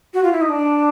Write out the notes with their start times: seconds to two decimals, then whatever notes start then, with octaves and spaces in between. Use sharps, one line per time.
0.14 F#4
0.23 F4
0.32 E4
0.41 D#4
0.49 D4